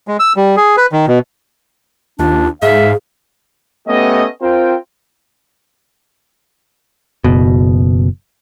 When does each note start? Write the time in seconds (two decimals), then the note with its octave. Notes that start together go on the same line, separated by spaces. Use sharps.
0.08 G#3
0.20 E6
0.36 G3
0.57 G#4
0.77 B4
0.92 D#3
1.07 B2
2.19 D#2 D4 F4
2.62 G#2 G#4 E5 F5
3.87 A3 B3 C#4 G4 D#5
4.42 C4 F4 A#4 C5 G5
7.24 F#1 B2